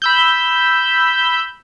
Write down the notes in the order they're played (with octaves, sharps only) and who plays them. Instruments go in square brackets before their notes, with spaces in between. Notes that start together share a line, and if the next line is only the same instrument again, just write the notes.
[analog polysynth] B5 E6 G6